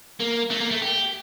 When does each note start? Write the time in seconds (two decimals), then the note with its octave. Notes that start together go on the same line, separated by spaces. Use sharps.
0.20 A#3
0.51 A3
0.61 A#3
0.71 A3
0.82 G4